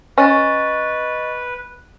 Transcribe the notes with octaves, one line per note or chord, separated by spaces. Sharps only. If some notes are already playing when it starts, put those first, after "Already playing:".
C#4 B4 D#5 C#6 A6